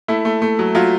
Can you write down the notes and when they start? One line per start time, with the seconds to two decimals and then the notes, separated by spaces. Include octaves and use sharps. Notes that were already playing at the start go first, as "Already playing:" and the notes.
0.08 A3 E4
0.25 A3
0.42 A3
0.59 F#3
0.75 F#3 F4